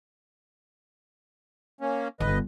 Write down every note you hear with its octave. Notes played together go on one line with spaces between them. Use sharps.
A#3 C#4
G1 B4 D#5